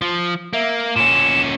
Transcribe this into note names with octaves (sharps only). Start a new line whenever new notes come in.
F3
A#3 E5
A#2 C#4 E7